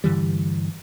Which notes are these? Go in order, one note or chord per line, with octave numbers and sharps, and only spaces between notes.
G2 D3 E3 G3